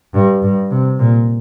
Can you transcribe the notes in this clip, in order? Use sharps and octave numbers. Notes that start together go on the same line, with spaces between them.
G2
G2
C3
A#2